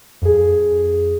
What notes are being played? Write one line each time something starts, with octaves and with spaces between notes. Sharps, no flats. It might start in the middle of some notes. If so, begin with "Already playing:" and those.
F2 G#4